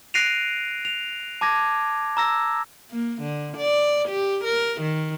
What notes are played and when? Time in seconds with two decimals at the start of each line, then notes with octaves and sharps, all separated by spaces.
0.14 F#6 A#6 C7 D7 D#7 F7
0.85 F7
1.41 A5 D6 G#6 A#6
2.17 A#5 E6 A#6
2.91 A#3
3.22 D3
3.57 D5
4.08 G4
4.44 A#4
4.81 D#3